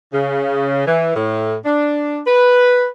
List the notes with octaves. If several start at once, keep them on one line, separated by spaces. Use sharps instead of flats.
C#3
E3
A2
D4
B4